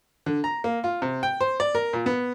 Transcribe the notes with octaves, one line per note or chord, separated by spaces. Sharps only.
D3
A#5
A#3
F4
C3
G5
C5
D5
A#4
A#2
B3